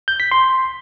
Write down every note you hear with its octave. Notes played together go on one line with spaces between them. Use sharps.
G6
B6
C6